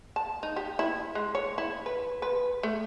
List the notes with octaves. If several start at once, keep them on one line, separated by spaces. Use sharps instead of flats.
A5
D#4
G4
E4
G#3
C#5
E4
B4
B4
A3